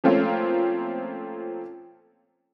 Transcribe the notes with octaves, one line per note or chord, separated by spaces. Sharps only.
F3 A3 A#3 C4 C#4 F4